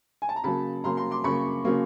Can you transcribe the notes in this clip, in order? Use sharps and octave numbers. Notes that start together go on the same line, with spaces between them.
G#5
A5
A#5
C#3 F#3 A#3 A5 B5
C#3 F#3 A#3 A#5 C6
A#5 C6
C6 D6
C#3 F#3 A#3 B5 C#6
C#3 F#3 A#3